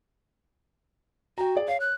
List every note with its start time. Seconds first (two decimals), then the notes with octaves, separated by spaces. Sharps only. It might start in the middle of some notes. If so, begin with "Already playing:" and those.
1.38 F#4 G5 A#5
1.55 G#4 D5
1.68 C#5 F5
1.80 F#6